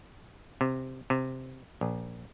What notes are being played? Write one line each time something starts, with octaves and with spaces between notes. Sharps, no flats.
C3
C3
A#1